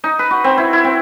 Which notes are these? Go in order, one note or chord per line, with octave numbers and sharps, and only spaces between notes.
D#4
B4
F#4
C4
E4
E4
C4